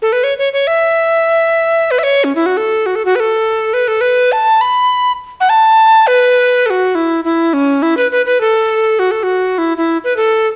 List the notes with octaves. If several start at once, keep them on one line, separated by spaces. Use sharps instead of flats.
A4
B4
C#5
C#5
C#5
E5
B4
E5
C#5
C#4
E4
F#4
A4
F#4
A4
F#4
B4
A4
B4
A4
B4
A5
B5
F#5
A5
B4
A4
F#4
E4
E4
C#4
E4
B4
B4
B4
A4
F#4
A4
F#4
E4
E4
B4
A4